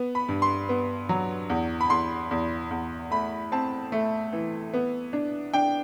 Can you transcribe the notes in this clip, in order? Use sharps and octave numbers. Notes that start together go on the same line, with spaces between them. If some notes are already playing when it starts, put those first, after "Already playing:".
Already playing: B3
B5
G2
C6
B3
F#3
E2
B5
E2 C6
E2
E2
A3 B5
C4 A5
A3
E3
B3
D4
D4 G5